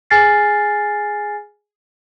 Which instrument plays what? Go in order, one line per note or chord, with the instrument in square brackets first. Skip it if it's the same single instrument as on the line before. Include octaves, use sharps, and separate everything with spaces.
[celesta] G#4 G#5 F6 A6 C7